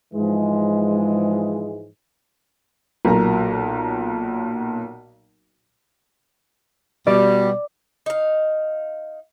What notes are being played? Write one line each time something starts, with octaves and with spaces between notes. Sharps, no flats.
G#2 E3 F3 G#3
B1 A#2 F#3 A#4 A#5
B2 G3 D5
D#4 F5